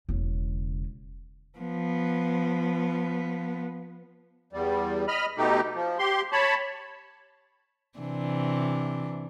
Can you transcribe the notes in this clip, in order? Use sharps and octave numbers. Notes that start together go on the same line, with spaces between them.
E1 C#3
F3 B3
E2 G3
D#5 B5 F6
B2 A3 D#4 G4
F3
G4 C6
C#5 A5 B5
C3 E3 D4